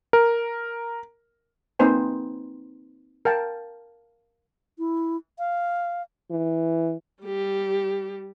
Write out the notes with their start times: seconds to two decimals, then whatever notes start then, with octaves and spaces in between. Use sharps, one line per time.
0.13 A#4
1.79 A#3 C4 D#4 B4 C5 G#5
3.25 A#4 F5 G5 A5
4.78 E4
5.39 F5
6.31 E3
7.23 G3 G4